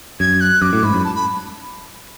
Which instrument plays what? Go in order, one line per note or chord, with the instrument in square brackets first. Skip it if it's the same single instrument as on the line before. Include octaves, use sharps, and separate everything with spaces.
[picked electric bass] F#2 [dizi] G#6
[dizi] F#6
[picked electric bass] F#2 [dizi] D6
[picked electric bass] A2
[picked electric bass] G#2 [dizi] B5
[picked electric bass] F#2
[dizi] A5
B5